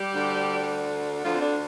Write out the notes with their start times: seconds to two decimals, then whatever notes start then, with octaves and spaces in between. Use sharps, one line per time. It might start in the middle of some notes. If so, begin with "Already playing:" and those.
Already playing: G3 G4
0.14 D2 D3
1.23 D2 D3 F3 F4
1.34 C4
1.41 D3 D4